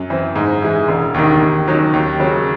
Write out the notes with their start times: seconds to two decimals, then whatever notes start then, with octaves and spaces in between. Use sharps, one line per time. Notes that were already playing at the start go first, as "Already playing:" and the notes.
Already playing: F#2
0.10 E3 C4
0.36 G#2
0.62 E3 G#3
0.88 E1
1.14 D#2 D#3
1.41 D#2
1.68 D#3 F#3 C#4
1.93 D#2
2.20 C#3 F#3